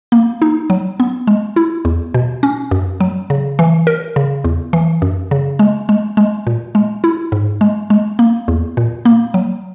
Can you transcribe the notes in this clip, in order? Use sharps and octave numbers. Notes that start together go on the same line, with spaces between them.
A#3
D#4
F#3
B3
G#3
E4
E2
B2
C#4
F#2
F#3
C#3
E3
A#4
C#3
E2
E3
F#2
C#3
G#3
G#3
G#3
A#2
G#3
E4
G#2
G#3
G#3
A#3
E2
A#2
A#3
F#3